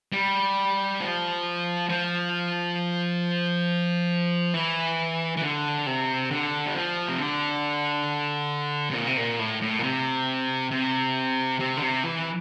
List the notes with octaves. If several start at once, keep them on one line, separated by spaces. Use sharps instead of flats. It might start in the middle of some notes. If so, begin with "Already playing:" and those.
G3
F3
F3
E3
E3
D3
C3
D3
G3
F3
C3
D3
C3
A#2
C3
A#2
A2
A2
A#2
C3
C3
C3
D3
C3
E3